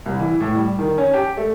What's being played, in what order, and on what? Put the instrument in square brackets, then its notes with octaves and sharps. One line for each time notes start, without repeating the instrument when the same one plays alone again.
[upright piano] C2
E3
A2
G3
D#3
C#4
G4
A3